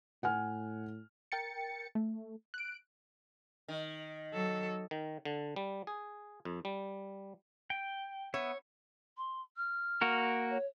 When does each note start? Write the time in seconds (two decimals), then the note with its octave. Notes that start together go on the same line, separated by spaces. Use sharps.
0.23 A2 F#5 G#5 F6
1.32 A#4 G5 A6 C#7
1.95 A3
2.54 F#6 D7
3.68 D#3
4.33 F#3 A4
4.91 D#3
5.25 D3
5.56 G3
5.87 G#4
6.45 F2
6.65 G3
7.70 G5
8.34 B3 C#5 E5
9.17 C6
9.57 F6
10.01 A#3 F#4 A#4
10.49 C#5